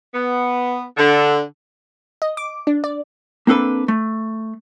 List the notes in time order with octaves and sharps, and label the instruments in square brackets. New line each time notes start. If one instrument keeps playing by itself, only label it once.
[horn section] B3
D3
[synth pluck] D#5
D6
D4
D5
[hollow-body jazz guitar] A#3 C4 D4 A4 B4
A3